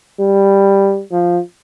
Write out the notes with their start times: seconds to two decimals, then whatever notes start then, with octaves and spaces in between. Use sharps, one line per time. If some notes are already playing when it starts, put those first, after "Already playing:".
0.20 G3
1.12 F3